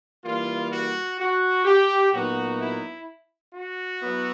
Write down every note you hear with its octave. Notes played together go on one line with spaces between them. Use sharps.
E3 G3 A#3 F4
F#4
F#4
G4
A#2 F#3 B3 D#4 F#4
E4
F#4
F#3 B3 E4